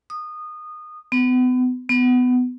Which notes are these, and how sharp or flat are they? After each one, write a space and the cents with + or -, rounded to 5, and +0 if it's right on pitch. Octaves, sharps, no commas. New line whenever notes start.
D#6 -20
B3 +35
B3 +20